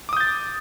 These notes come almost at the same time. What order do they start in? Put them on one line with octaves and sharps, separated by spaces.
D6 D#6 G6 A6